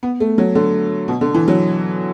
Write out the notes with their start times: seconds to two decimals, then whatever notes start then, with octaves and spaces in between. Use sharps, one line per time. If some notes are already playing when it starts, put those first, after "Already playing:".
0.03 B3
0.20 A3
0.38 F#3
0.55 D3
1.08 B2
1.21 D3
1.34 E3
1.48 F#3